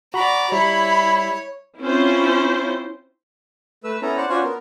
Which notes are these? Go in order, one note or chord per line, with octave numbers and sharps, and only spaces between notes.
F#4 D5 A#5 B5
G3 E4 C#5 B5
C4 C#4 E4 F4 C5
A3 B4 E6
B3 C#4 E4 A4 A#5
C5 D5 F#5
C#4 D4 F4 F#4 C5 C#5
B3 A#4